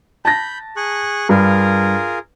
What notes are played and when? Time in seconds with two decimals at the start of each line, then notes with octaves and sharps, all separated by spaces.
0.25 A5 B5 G6 A#6
0.77 G#4 C#6 F#6
1.29 G2 F4 G#4 A#4